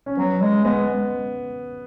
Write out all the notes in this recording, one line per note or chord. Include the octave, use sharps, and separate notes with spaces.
C#4
F#3 B3
G#3
G#3 B3